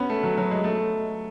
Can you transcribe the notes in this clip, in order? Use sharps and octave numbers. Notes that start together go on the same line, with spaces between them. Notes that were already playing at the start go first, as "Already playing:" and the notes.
Already playing: B3 C#4 F#4
A3
F#3
F#3
G#3
A3